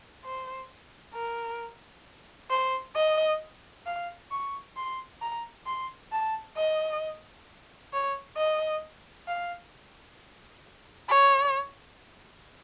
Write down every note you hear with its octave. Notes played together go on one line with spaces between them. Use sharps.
C5
A#4
C5
D#5
F5
C#6
C6
A#5
C6
A5
D#5
C#5
D#5
F5
C#5